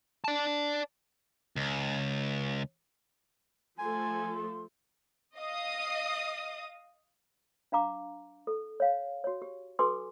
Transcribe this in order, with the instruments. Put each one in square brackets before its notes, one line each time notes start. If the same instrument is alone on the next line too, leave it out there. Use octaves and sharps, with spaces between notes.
[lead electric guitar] D5 A5
[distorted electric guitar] C#2
[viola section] F3 A3 A4 [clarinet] G#5 [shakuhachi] C6
[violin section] D#5 F5 D#6
[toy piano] D4 F5 A#5 D6
A4
C#5 F5
F#4 C#5
G4
F#4 A4 B4 G#5 C6 D6